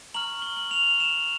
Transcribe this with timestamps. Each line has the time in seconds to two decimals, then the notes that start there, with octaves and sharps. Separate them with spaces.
0.14 A#5 C#6 F6 F#7
0.42 G7
0.57 F#7
0.71 C#6 F6 F7
1.00 E7